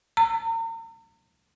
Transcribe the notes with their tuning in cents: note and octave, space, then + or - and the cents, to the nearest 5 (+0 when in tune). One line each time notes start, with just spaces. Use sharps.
A#5 -40